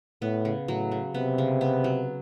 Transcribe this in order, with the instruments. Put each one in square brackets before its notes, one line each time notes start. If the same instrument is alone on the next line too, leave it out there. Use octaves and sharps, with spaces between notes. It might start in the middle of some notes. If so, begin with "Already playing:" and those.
[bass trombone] A2 [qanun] B3
[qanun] C#3
[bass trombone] A2 [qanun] F#3
[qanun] C#3
[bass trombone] C3 [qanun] B3
[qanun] C#3
B3
F#3